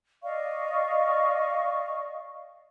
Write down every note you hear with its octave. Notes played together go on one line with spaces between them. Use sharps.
D5 D#5 F5 C#6